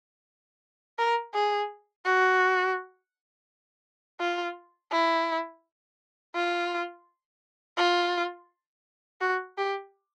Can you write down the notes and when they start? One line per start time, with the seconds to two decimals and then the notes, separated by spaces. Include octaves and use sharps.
0.99 A#4
1.34 G#4
2.06 F#4
4.20 F4
4.92 E4
6.35 F4
7.77 F4
9.21 F#4
9.58 G4